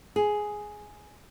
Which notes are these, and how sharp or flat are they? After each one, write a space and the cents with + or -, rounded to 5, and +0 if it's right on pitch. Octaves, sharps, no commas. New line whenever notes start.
G#4 +5